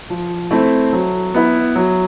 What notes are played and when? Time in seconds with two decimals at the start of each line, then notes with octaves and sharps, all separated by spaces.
0.10 F3
0.51 A3 C4 E4
0.93 F#3
1.34 B3 E4
1.75 F#3